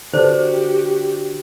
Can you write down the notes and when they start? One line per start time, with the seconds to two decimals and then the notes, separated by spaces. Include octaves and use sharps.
0.13 D3 D4 F#4 G4 B4 C5